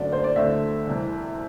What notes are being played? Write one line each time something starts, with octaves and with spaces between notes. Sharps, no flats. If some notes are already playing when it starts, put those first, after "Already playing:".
Already playing: F#2 D3 F#3 A3 C4 D5
C5
D5
D2 D3 A3 C4 E5
C2 C3 E3